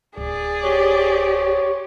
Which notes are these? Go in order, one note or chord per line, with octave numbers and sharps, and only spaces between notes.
D1 G#4 D5
G4 C5 C#5